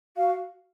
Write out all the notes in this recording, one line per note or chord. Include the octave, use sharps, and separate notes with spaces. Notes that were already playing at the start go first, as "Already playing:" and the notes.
F#4 F5